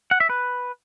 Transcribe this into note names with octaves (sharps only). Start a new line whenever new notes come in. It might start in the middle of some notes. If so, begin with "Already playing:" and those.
F#5
E5
B4